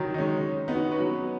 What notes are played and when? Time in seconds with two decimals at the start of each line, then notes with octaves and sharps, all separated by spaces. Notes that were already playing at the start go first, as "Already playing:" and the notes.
Already playing: D#3 F#3
0.14 D#4
0.18 G#3 C#4
0.68 B3 D#4
0.75 C#4 F#4
0.92 F#4 B4
1.00 F#3 B3